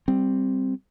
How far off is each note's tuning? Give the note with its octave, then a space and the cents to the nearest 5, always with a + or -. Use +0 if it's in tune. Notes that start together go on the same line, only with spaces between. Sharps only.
G3 +0 C4 +0